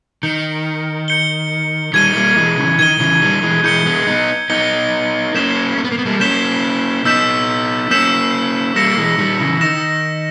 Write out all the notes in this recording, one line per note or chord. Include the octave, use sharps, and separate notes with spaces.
D#3 G6 C#7 G7
G6 C#7 G7
D#3 G3 G#6 D#7 G7
G3 A#3
E3 G#3
C#3 E3
D#3 G#6 D#7 G7
C#3 E3
D#3 G3
E3 G#3
E3 G#3 G6 C#7 G7
G#3 B3
B3 D#4
B3 D#4 G6 C#7 G7
A#3 C#4 G6 B6 E7 G7
A#3
B3
A#3
B3
G3 A#3
A#3 C#4 G6 B6 E7 G7
B3 D#4 E6 G6 B6 E7
A#3 C#4 E6 G6 B6 E7
G3 A#3 E6 A#6 C#7 E7
E3 G#3
D#3 G3
C#3 E3
D#3 E6 A#6 C#7 E7